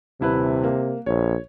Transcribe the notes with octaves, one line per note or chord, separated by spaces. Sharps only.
D#1 C3 E4 B4
A#3
A#1 C#5